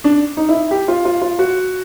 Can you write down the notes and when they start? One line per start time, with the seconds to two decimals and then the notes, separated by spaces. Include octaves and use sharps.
0.04 D4
0.37 D#4
0.49 E4
0.71 G4
0.88 F4
1.05 F4
1.22 F4
1.39 F#4